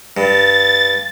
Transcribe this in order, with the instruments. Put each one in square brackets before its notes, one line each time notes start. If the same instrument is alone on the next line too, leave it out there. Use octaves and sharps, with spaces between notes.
[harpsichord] G2 [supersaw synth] A6